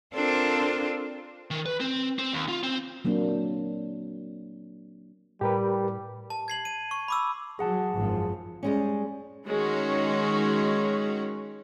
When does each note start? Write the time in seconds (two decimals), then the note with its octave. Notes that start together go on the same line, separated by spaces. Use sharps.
0.13 C4 D4 F4 A4 A#4 C5
1.51 D#3
1.66 B4
1.80 C4
2.19 C4
2.33 D#2
2.48 F4
2.63 C4
3.05 F#3 A#3 C4 D4
5.41 A2 G3 G4 A#4 B4
6.30 A5
6.48 G#6 C7 F#7
6.65 D#7
6.91 C#6
7.08 B5 D6 E6
7.59 F#3 G#4 F#5 A5
7.93 G#1 F#2 F3
8.63 G3 G#3 C#4
9.45 D#3 G#3 C#4 F#4 C#5